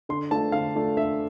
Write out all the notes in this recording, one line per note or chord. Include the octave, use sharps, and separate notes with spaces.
D3 C6
A3 D4 F4 A5
D3 F5
A3 D4 F4
D3 E5